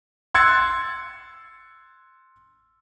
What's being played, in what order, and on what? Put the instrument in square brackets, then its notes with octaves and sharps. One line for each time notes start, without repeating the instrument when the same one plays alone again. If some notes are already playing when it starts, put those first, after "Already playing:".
[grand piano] C6 E6 F#6 G#6 A6 C#7